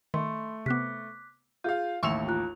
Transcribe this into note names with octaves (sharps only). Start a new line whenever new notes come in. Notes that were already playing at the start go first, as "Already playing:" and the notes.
D#3 A3 C6
C3 B3 D6 F#6 B6
F4 G#4 F5 G6
A1 D#2 E5 C6 C#6 E6 C#7 F7
F4 A#5 F#6